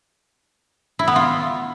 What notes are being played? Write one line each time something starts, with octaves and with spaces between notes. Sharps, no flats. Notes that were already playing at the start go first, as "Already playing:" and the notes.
E4
B3
F4